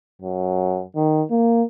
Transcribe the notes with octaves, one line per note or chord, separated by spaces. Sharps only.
F#2
D#3
A#3